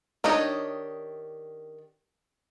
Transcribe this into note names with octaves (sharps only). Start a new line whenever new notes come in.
D#3 D4 G4 C#5 D#5